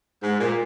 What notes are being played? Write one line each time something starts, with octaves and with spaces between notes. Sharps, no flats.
G#2
A#2